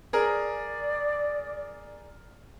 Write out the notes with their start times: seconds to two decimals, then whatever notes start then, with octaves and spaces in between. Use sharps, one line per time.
0.13 G#4 A#4 D5